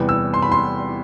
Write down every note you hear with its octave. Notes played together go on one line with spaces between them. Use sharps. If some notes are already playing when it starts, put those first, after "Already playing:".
Already playing: E2 C3 G3 B3
E6
C6
B5
C6